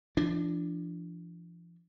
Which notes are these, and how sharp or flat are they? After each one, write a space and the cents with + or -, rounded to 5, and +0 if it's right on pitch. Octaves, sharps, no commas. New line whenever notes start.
F3 -40 D4 +0